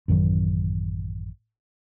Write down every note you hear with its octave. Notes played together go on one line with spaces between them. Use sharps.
A1 F#2 D#3 F#3